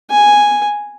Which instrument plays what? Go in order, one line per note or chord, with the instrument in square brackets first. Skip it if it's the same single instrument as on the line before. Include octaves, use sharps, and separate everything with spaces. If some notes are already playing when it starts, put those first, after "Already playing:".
[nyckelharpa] G#5